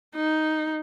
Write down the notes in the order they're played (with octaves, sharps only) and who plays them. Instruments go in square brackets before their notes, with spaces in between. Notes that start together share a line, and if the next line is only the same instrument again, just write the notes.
[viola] D#4